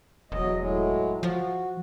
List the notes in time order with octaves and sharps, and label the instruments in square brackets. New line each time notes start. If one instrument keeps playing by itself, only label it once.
[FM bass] E1 [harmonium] E2 F#3 D#5
[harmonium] A2 F#3 G#3
[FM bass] F3 [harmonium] F#4